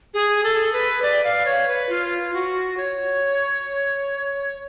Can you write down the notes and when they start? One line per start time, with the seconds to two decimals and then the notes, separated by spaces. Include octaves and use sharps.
0.14 G#4
0.44 A4
0.73 B4
1.02 D5
1.24 F5
1.45 C#5
1.68 B4
1.89 F4
2.34 F#4
2.77 C#5